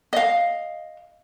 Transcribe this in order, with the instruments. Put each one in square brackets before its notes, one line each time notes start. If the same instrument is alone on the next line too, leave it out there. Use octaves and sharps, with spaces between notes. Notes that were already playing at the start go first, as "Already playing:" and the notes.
[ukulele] D#5 F5